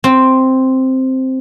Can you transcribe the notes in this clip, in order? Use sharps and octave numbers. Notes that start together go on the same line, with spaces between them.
C4